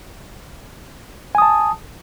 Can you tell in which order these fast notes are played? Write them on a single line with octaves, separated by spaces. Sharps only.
G#5 D#6 A5